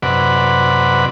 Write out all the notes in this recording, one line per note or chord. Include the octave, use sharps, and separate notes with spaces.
F#2 C3 B4 D5 F#5